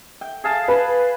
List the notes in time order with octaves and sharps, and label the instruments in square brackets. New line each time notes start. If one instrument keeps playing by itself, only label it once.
[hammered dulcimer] G5
G#4 F5 A5
[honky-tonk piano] B4